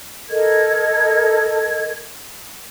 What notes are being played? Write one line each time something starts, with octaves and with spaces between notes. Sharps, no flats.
A4 A#4 D#5 G#6